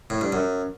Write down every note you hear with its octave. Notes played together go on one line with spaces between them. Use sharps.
A2
G2
F#2